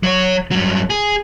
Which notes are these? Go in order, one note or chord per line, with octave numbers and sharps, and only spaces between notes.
F#3 C#5
G2 F#3
G#4